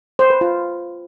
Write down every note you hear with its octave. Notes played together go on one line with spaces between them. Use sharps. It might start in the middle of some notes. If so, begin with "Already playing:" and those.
C5
B4
F4